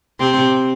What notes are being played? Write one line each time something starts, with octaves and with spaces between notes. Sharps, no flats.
C3 C4